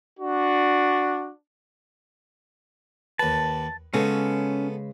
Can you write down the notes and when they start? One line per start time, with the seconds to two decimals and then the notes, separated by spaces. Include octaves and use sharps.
0.19 D4 F#4
3.19 D#2 B4 A5
3.94 C#3 G#3 B3 C#4 A4 B4